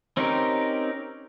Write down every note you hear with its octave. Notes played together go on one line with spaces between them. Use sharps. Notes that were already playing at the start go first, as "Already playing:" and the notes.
C4 C#4 D#4 G4 A#4